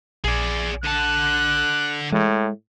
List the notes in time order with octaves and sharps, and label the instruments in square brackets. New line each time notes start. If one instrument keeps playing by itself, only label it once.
[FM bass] A#1 [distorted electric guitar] G#4 D5
[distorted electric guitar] D3 A5 [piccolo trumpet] F#6
[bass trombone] A2 [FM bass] G#3